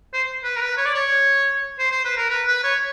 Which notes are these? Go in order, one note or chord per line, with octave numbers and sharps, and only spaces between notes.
C5
B4
A#4
B4
C#5
D5
C#5
C5
C5
B4
A#4
B4
B4
C#5